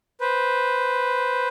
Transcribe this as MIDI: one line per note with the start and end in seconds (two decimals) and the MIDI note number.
0.21 1.48 71
0.21 1.48 72